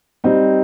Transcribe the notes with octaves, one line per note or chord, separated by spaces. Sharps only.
G3 C4 D#4